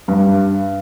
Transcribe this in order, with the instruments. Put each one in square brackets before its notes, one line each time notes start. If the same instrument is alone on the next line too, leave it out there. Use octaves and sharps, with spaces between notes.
[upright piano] G2